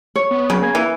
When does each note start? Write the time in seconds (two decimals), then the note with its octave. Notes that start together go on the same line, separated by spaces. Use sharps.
0.16 C#5
0.31 B3
0.50 C#3 F#3
0.62 A#3 G#5 G#6
0.75 E3